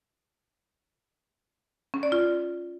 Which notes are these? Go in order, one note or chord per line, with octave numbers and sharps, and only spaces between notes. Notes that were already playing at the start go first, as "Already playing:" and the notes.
C#4
D5
F4